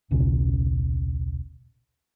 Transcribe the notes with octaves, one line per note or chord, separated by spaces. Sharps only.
D#1 B1 C#3